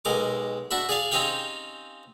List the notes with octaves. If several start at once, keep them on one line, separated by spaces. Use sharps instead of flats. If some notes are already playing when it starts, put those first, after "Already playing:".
B1 G#3 A#4 D6
D4 F#4 E5 B5
G#4 D5 F5
C4 C#4 D#4 G4 F5 G5